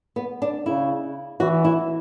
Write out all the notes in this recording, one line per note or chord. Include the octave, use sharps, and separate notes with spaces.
B3
D4
C#3 E4
E3 F#4
E4